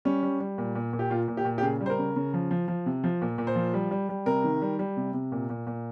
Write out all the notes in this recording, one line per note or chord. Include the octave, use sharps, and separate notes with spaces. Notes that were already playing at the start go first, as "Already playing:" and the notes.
G3 C#4
G3
G3
A#2
A#2
A#2
G4
A#2 F4
A#2
G4
A#2
G4
C#3 G#4
G3
C5
A#4
C#3
C#3
F3
F3
F3
C3
F3
A#2
A#2
C5
F3
G3
G3
G3
C3 A#4
D#3
G3
G3
C3
C3
A#2
A#2
A#2